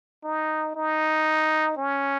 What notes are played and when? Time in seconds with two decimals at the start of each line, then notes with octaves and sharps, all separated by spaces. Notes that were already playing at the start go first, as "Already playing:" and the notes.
0.23 D#4
0.75 D#4
1.77 C#4